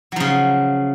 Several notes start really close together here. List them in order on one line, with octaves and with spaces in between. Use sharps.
F#3 F3 C#3